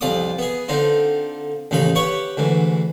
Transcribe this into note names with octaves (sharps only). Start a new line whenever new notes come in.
C2 F2 F4 D5 D6 D#6
B3 G#4
D3 C4 D#4 F4
A1 D#2 C#3 D#4 F5 B5
G4 B4 C#5 F#5 C#6
D2 G#2 E3